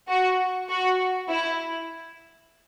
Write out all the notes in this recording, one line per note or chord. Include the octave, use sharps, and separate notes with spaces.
F#4
F#4
E4